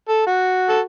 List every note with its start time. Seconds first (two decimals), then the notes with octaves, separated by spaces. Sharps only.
0.09 A4
0.27 F#4
0.69 A4